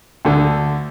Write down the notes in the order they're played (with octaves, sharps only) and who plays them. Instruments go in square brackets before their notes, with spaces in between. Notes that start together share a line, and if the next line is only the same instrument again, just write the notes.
[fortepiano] D2 D3